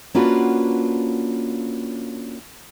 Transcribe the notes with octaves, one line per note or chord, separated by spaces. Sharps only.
A#3 C#4 D4 F4 F#4 B4